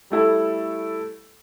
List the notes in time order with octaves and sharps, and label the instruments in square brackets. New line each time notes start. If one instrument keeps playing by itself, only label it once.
[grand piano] G3 A3 E4 A4